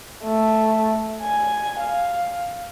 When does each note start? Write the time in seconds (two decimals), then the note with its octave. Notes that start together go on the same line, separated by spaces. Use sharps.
0.23 A3
1.22 G#5
1.79 F5